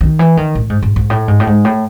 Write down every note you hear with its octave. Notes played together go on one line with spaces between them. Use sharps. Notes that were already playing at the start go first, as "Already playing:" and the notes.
D#3
E3
D#3
A2
G#2
G#2
G#2
A2
G#2
A2
G#2
A2